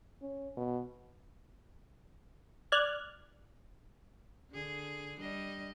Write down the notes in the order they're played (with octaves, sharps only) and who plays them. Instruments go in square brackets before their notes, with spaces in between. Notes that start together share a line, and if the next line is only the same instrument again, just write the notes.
[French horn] C#4
B2
[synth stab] D5 F6 F#6 G#6
[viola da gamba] D3 G#4
G3 D4 D#5